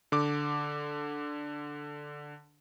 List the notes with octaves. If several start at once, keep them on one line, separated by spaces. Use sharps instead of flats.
D3 D6